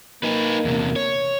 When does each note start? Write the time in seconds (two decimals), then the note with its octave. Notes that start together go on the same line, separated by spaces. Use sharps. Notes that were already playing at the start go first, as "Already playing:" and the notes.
0.23 A#3 D#4 B4
0.65 E2 C3
0.96 C#5